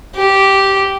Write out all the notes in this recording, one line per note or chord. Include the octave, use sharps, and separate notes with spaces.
G4